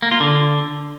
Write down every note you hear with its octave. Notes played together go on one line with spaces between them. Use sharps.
A#3
F4
D3